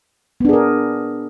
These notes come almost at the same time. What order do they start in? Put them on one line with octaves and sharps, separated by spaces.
B3 D4 G#4 A#4